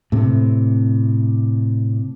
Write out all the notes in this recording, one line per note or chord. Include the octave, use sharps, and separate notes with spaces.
A2 C3